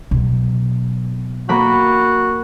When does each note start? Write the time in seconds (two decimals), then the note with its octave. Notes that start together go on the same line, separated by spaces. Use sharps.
0.11 B2 F#3
1.49 A#3 F#4 B5 F#6